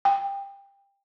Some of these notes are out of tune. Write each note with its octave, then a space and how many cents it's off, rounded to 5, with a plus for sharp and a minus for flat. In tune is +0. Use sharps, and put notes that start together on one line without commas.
G5 +20